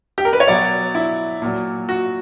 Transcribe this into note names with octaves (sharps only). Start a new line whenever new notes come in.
G4
A#4
B4
C#5
B2 F#3 D5
E4
A#2 F#3
F#4